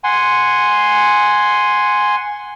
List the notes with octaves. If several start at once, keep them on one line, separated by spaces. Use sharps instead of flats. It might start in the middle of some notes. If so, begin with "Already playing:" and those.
F#5 G#5 C6